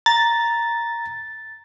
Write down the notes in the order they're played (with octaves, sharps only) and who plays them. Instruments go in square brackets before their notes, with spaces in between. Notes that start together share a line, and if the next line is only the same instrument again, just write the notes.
[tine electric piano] A#5 [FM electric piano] A6